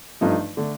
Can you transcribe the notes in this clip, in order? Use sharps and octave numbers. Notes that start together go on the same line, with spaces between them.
G2 F3 A3 D#4
D3 A3 D4